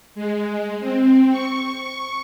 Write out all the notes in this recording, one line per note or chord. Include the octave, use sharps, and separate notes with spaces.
G#3
C4
C#6
C#6